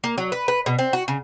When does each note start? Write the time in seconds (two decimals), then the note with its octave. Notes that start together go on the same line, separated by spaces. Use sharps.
0.04 A#3
0.18 F#3
0.32 B4
0.48 B4
0.66 B2
0.79 C4
0.93 F#4
1.08 C#3